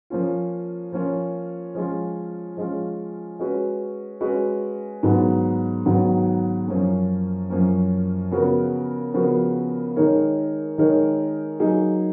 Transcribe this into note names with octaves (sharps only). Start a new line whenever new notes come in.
F3 A#3 C#4 F4
F3 A#3 C#4 F4
F3 G#3 C#4 F4
F3 G#3 C#4 F4
G#3 C#4 F#4 B4
G#3 C#4 F#4 B4
G#2 D#3 F#3 B3
G#2 D#3 F#3 B3
F#2 F3 A#3 C#4
F#2 F3 A#3 C#4
C#3 F3 B3 F#4 A#4
C#3 F3 B3 F#4 A#4
D#3 G#3 D#4 A#4 C#5
D#3 G#3 D#4 A#4 C#5
F#3 A#3 D#4 G#4